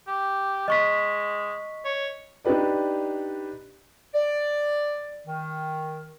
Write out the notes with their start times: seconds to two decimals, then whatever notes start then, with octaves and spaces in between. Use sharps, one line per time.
0.08 G4
0.68 G#3 D#5 C#6 B6
1.85 C#5
2.45 D4 D#4 G4 B4 D5
4.14 D5
5.26 D#3